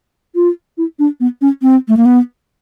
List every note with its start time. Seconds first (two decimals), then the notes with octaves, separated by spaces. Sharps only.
0.35 F4
0.78 E4
0.99 D4
1.20 B3
1.41 C#4
1.62 C4
1.88 A3
1.97 A#3
2.05 B3